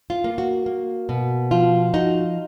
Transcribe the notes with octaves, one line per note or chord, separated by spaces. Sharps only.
F4
A#3
F#4
A#3
B2
F3 F4
D#4 F#4